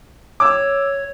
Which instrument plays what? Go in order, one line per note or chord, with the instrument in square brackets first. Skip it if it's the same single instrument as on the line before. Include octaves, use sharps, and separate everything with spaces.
[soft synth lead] C#5 [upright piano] D6 E6